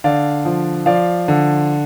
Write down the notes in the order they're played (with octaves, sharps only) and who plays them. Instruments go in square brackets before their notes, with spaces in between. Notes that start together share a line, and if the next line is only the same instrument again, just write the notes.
[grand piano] D3 D5 F5
F3
F3 D5 F5
D3